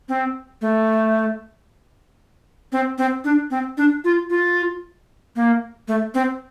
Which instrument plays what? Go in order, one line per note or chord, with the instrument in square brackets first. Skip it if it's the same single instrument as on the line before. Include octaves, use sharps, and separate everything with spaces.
[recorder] C4
A3
C4
C4
D4
C4
D4
F4
F4
A#3
A3
C4